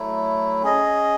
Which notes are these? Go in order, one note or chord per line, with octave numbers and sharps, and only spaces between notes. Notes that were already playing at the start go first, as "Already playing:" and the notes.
Already playing: F#3 A3 E4
C#4 G#4 D#5